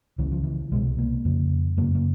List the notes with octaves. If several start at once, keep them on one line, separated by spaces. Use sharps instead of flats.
C#2 C#3 E3
F3
E3
C2 B2 G#3
A#3
F2 C#3
F#2 C#3 A#3
A#3